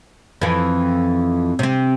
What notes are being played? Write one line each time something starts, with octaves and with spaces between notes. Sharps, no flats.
F2 E3
C3 C4